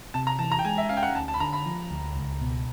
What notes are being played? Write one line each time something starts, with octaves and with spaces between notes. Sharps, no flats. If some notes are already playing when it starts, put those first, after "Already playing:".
C3 A5
A#5
E3 A5
A#5
G5
G#3 G#5
E5
C#4 F5
G5
F#5
D2 A5
A5
B5
D3 A#5
B5
F3
D2
C#2
B2